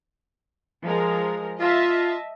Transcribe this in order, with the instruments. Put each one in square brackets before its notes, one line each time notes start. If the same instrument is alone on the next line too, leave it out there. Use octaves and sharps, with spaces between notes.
[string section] F3 G#3 A#4
[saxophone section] F4 [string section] D#5 E5 A5